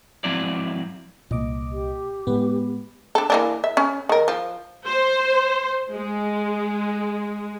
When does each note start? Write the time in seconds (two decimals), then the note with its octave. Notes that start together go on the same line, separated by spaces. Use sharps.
0.24 G#2 F3 F#3 C4 E4 D5
1.31 C2 A#2 A#3 D#5 D6
1.72 G4
2.27 A2 G#3 B3 B4
3.15 D4 A4
3.30 E3 A#3 D4
3.64 E5
3.77 C#4
4.09 D#3 A#4
4.28 F3
4.87 C5
5.93 G#3